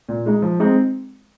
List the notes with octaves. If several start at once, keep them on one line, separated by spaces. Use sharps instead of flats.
A#2
G#3 D#4
F3
G#3 C4 D#4